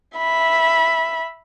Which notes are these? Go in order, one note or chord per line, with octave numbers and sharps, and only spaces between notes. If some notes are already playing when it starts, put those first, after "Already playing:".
E5 B5